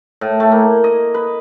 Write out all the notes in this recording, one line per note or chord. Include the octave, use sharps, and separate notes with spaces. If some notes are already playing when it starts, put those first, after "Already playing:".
A2
A3
A#3
D#5
B4